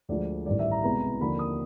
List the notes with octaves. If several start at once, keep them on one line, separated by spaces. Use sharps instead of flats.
D2 D3 F3 G#3 D5
A1 G2 D#3 D5
E5
A#5
C2 B2 G#3 B3 A#5
D#2 D3 F3 A#3 B5
D#6